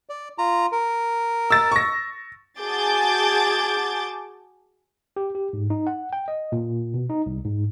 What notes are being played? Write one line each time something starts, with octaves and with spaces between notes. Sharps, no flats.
D5
F4 A#5
A#4
E6 A6
C#6 A#6
F#4 G#4 A5 D6 G6 A6
G4
G4
G#2
D#4
F#5
G5
D#5
A#2
B2
D#4
C2
G#2